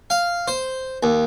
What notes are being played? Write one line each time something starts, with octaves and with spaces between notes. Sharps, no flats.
F5
C5
D#2